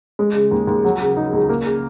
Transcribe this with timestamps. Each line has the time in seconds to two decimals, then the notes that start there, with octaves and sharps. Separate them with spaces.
0.19 G#3
0.35 C#3
0.51 D#2
0.67 D#2
0.84 F#3
1.01 C#3
1.17 D#4
1.33 C#2
1.49 A#3
1.66 C#3